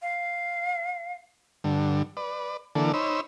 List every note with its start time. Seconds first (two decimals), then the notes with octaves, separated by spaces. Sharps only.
0.02 F5
1.64 G2 D3
2.17 B4 D5
2.75 D3 E3 A#3 A4 D5
2.94 D#4 C5 C#5 B5 E6